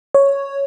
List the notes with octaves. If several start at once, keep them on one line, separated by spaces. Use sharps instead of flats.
C#5